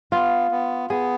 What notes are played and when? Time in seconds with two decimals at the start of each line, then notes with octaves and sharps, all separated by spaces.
0.12 B3 F4
0.51 B3
0.90 B3 G#4